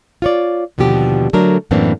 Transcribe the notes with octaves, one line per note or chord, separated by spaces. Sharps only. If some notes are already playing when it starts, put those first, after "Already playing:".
F4 C#5 D5
D#2 B2 D3 F3 G4
D3 F#3 A3 D4 A#4
F#2 A2 E3 A#3 C4 D4